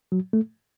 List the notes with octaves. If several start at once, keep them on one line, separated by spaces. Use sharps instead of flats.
F#3
A3